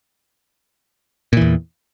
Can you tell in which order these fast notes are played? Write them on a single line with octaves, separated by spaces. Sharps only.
A#2 E3 E2